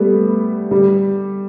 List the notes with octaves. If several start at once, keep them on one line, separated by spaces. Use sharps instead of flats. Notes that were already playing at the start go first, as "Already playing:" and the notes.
Already playing: G3 A3 B3
G3